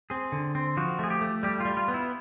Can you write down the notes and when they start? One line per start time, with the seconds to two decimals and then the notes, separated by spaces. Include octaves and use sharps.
0.10 C4 G#4
0.32 D3
0.55 C4
0.77 F3 F#4
0.99 A3 G#4
1.10 G4
1.21 A3
1.43 G3 G4
1.60 G3 F4
1.77 F4
1.88 B3
1.94 E4